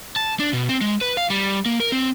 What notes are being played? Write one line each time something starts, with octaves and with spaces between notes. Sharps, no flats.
A5
D4
B2
C4
G#3
B4
F5
G3
A#3
A#4
C4